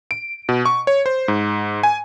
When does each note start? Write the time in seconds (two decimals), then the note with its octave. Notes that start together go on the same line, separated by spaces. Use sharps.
0.11 D7
0.49 B2
0.65 C#6
0.87 C#5
1.06 C5
1.28 G#2
1.83 G#5